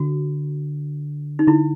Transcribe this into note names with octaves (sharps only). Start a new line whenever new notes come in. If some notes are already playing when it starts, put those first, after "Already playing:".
Already playing: D3 F#4
D#4
D3 E4